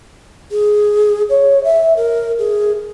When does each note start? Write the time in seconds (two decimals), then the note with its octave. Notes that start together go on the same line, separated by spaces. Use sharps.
0.52 G#4
1.30 C#5
1.64 E5
1.97 A#4
2.39 G#4